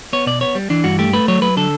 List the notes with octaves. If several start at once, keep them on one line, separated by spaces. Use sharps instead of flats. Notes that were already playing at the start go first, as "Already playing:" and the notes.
B3 C#5
B2 D5
B3 C#5
G3
E3 D4
G2 F#4
A3 G4
A3 B4
F#3 C#5
F#3 B4
D3 A4